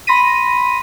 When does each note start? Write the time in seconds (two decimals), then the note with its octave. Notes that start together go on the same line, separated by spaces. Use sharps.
0.07 B5 C6 A#6 B6 D#7